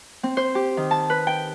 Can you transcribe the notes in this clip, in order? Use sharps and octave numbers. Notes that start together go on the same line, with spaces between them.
C4
C5
G4
D#3
A5
B4
G5